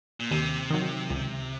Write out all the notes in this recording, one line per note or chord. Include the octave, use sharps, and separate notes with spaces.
A#2
D#2 C3
D#3 F#3
C#2